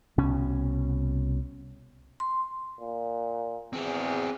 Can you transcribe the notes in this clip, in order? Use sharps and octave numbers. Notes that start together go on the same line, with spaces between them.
C2 B2 C#4
C6
A#2
E2 C4 G#4